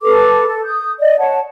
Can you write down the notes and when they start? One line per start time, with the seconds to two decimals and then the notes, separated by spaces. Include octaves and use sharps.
0.01 A4 B4 D6
0.47 A4
0.64 D#6 G6
1.00 D5 D#5
1.19 C#5 F#5 A5